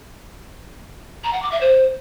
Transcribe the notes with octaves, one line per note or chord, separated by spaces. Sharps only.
A#5
F#5
D6
E5
C5